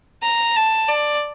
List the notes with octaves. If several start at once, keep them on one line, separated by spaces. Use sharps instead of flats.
A#5
A5
D5